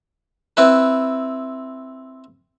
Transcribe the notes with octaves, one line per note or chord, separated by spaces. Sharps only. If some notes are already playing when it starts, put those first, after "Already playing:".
C4 E4 B4